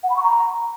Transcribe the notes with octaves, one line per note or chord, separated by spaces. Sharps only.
F#5
B5
C#6
A#5